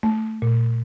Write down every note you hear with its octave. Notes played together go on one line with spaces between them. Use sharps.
A3
A#2